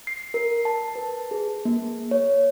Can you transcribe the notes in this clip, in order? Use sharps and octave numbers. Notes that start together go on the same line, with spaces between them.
C7
A#4
A5
B4
G#4
A#3
C#5